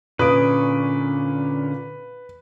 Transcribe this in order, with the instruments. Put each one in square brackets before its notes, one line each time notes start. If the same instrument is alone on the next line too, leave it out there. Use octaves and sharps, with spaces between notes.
[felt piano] A#2 D#6 D7 [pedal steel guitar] D3 C#4 [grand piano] B4